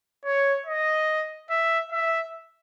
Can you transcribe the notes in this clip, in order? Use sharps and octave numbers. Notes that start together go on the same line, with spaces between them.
C#5
D#5
E5
E5